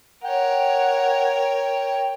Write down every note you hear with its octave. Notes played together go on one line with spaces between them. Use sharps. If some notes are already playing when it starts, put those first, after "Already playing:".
A#4 C#5 F#5 G5